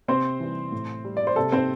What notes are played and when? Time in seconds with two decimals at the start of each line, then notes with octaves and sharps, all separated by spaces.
0.08 C3 C4 C5
0.40 E3 G3
0.72 A2
1.05 G3
1.17 D5
1.27 C5
1.36 C3 A4
1.52 C4 C5